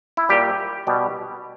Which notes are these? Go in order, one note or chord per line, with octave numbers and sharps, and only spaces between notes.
E4
A#2 G3 G4
B2 G3